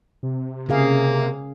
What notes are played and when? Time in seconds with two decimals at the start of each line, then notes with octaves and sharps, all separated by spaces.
0.23 C3
0.69 C#3 A#3 G#4 F5